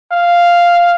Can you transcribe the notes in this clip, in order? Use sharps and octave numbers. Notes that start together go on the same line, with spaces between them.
F5